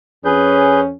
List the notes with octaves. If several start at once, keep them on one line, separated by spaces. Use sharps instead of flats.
F2 C#4 G#4 B4 G6